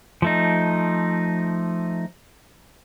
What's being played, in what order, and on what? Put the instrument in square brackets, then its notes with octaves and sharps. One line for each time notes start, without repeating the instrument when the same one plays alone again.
[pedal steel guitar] F3 A3 D#4